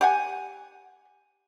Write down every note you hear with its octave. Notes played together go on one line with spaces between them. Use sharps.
G4 F#5 G#5